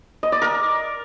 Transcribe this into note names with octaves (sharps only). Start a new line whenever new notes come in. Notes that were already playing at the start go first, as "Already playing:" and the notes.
D#5
D5
A#4